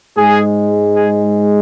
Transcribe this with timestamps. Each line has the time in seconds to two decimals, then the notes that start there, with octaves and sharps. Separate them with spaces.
0.17 G#2 G#3 G#4
0.96 G#4